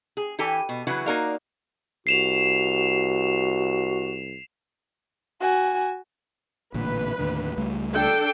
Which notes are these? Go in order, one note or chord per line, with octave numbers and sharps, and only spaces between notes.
G#4
E3 G4 A4 G5 G#5
B2
C#3 E3 F#3 E4 F#4 B4
A#3 D#4 F#4 A#4 D5 F5
C2 F#4 C7 E7 F7
F#4 G#5
A1 A#2 D3 B4
D#2 A2 D3
C#2 G3 A3
D4 A4 G5